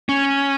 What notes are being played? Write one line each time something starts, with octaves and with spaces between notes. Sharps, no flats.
C#4